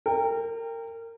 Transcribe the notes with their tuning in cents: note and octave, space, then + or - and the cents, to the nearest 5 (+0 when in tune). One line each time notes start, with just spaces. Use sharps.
A#4 -25 G5 +20